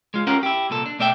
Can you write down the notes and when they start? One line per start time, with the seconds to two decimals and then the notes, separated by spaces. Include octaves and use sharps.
0.14 G#3 F4
0.27 C#4 F4 G4 A#4 F#5
0.43 E4 G4
0.70 C2 A#2 A4
0.86 D4
0.99 B2 A3 D5 E5 G5